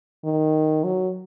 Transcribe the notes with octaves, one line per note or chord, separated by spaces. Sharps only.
D#3
F#3